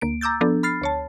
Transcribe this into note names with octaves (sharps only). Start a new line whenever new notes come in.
D2 A#3 D7
A#5 D6 E6 G6 A6
F3 B3 D4 A4
B5 F6 A6 C7
D2 C#5 A5